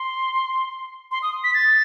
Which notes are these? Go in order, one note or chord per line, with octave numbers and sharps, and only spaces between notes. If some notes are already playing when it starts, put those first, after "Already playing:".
Already playing: C6
C6
D#6
B6
A6